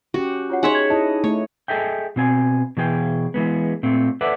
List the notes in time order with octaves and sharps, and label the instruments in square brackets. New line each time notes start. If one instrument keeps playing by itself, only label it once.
[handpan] C#4 G4 [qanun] F#4
[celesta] F4 C#5 F#5
[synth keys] D#4 G#4 [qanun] C#5 E5 F#5 [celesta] G#5 C6
[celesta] G#6
[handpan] E4 D#5 [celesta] A5
[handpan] A3 [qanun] C#5
[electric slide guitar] G#4 A4 D#5 E5 G5
B2 C4 G#5
B2 E3 G#4 G5
E3 G#3 B3
A#2 A3 C4
A4 B4 D5 E5 F#5